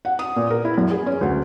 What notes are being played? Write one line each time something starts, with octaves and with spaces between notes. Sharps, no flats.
F#5
D#6
A#2
A#4
E4
F#2
G#4
C#4
D2